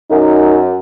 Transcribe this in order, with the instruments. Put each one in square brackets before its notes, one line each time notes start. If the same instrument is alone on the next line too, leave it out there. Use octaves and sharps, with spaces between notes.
[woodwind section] F#2 [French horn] D#4